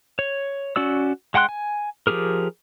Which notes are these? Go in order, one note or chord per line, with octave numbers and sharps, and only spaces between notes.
C#5
C#4 F#4 D5 E6
G#3 F#5 G5 C6 F#6
G#5
F3 D4 G4 G#4 A#4